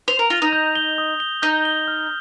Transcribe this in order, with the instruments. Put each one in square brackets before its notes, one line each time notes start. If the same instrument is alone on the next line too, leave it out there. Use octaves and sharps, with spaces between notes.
[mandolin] C5 [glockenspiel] F7
[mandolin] A#4
[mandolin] F4 [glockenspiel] A#6
[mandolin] D#4
[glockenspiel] G6
G7
D#6
G7
[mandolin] D#4 [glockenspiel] G6
[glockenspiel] G7
F6